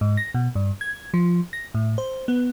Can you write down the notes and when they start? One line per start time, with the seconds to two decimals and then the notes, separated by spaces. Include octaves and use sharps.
0.01 G#2
0.17 A#6
0.34 B2
0.55 G2
0.81 G#6
1.14 F3
1.53 A#6
1.75 A2
1.98 C5
2.28 B3